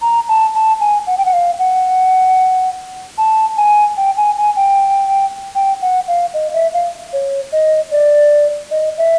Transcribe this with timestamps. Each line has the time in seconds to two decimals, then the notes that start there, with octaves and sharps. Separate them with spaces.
0.02 A#5
0.29 A5
0.55 A5
0.80 G#5
1.07 F#5
1.18 G5
1.25 F#5
1.33 F5
1.59 F#5
3.18 A5
3.57 G#5
3.97 G5
4.17 G#5
4.37 G#5
4.56 G5
5.55 G5
5.82 F#5
6.08 F5
6.34 D#5
6.54 E5
6.74 F5
7.13 C#5
7.52 D#5
7.92 D5
8.71 D#5
8.98 E5